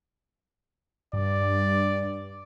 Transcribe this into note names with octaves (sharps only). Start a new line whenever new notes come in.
G2 D5